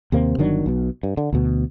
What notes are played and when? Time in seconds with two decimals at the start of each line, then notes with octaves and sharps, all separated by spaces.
0.12 D#2 C3 A#3 C4
0.38 G1 D#3 F#3 D4
0.66 B1 B2
1.03 G2
1.17 D3
1.33 D2 B2